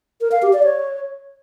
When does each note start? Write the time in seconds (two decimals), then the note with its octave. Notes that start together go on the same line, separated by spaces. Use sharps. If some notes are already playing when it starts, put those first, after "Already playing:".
0.21 A#4
0.32 F5
0.42 G4
0.53 D5
0.64 C#5